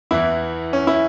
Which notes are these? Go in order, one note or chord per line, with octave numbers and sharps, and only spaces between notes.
E2 E3 E4
C#4
E4